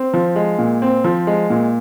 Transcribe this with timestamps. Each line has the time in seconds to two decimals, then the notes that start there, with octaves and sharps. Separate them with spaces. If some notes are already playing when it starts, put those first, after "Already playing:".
Already playing: C4
0.14 F3
0.36 G#3
0.59 A#2
0.82 C4
1.04 F3
1.27 G#3
1.50 A#2